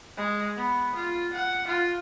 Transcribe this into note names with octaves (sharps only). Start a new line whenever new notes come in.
G#3
B3
F4
F#5
F4